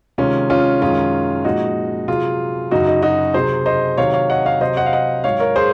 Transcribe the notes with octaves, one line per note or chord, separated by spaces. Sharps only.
C3 D#3 G#3 C#4 F4
C#4 F4
F#2 D#3 G#3 C#4 F4
A#2 F3 G#3 D#4 F#4
C3 F#3 F4 G#4
F#2 C#3 F#3 D#4 F#4
D#4
D#4 F#4
C3 F#3 G#4 C5
C5 D#5
C3 D#3 F#3 C#5 F5
C#5 F5
D#5 F#5
C#5 F5
C3 F#3 C5 D#5
D#5 F#5
F5
D#5 F#5
G#2 F#3 C#5 F5
A#4 C#5
G#4 C5